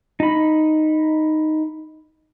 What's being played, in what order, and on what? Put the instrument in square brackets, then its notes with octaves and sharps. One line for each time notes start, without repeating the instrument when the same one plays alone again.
[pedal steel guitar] D#4 B5